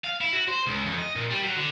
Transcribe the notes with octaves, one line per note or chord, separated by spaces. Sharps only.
F5
E4
F#4
C5
C#2
F2
D#5
A#2
G3
F#3
D3